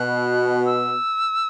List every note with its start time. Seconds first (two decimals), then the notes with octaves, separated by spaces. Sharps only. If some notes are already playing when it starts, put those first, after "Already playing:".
Already playing: B2 F#6
0.65 E6